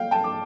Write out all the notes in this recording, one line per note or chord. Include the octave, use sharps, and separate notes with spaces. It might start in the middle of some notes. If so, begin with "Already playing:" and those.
Already playing: F5 G5
G5 A5
D6